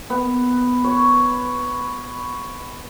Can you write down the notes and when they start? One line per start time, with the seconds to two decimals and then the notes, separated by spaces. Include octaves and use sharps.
0.10 B3
0.84 C#5